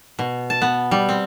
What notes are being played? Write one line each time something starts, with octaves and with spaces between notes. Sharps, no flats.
B2
A5
B3
G3
C4